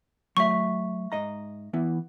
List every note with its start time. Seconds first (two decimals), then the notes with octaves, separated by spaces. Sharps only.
0.37 F#3 A3 E5 C#6
1.12 G#2 D#5 A#5
1.73 E3 B3 E4